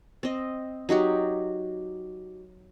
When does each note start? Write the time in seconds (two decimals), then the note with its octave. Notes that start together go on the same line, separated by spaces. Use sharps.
0.23 C4 D#5
0.89 F#3 D#4 F#4 G4